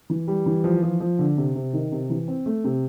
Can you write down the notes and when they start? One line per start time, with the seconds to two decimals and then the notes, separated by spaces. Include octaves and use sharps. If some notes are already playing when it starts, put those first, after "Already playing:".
0.10 E3
0.28 G3
0.46 E3
0.64 F3
0.82 F3
1.00 F3
1.19 D3
1.37 C3
1.55 C3
1.73 D#3
1.92 C3
2.10 E3
2.28 C4
2.46 A3
2.64 C3